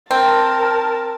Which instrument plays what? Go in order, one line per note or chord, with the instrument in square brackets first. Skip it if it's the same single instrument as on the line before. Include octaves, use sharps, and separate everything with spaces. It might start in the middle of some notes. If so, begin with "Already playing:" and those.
[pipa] C4 [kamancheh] A#4 A5